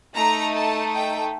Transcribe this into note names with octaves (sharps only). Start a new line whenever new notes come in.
A3 D#4 A4 A#5
A5
G5